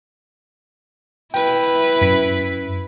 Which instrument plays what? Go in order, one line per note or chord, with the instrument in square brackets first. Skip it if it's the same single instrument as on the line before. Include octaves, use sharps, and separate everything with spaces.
[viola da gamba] E4 B4 [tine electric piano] G5
[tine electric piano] F#2 B6